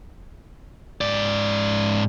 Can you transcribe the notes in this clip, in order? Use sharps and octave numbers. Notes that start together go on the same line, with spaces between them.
G#2 D5